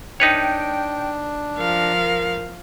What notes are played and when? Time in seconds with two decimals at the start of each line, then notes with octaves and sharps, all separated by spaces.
0.20 D4 D#4 B4 C#5 G5
1.58 F3 A#4 F5